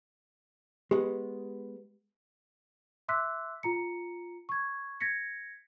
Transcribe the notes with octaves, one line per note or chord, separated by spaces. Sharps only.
G#3 B3 G4
E5 C6 D6 E6 F#6 B6
F4 A#5 C#7
C#6 G#6
G#6 A#6 B6 C#7